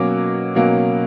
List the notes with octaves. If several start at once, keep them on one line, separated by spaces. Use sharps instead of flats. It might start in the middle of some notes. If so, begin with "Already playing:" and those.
Already playing: B2 F#3 A#3 C#4 D6
B2 F#3 A#3 C#4